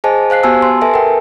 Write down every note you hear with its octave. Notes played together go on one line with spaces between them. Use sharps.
G#4 C5 D#5 G#5 A5
C5 F5 F#6 C7
B3 F#4 G4 G#5 A5 E6
C6
A4 B4 E5 G#5 A5
A#4 G5